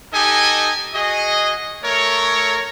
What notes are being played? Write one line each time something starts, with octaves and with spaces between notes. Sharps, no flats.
D#4 G4 A4 D#5 G#5
F#4 G#4 D#5
A3 A#4 C#5